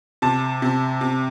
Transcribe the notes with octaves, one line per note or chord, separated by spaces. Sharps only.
C3 A5
C3
C3